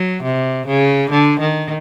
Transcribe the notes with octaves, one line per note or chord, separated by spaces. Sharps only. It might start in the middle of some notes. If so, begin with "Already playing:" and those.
Already playing: F#3
C3
C#3
D3
D#3